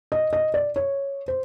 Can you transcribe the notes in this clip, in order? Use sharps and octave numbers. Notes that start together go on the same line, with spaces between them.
D#5
D#5
D5
C#5
C5